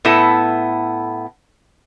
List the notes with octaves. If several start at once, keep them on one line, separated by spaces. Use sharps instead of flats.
A2 B3 E4 A4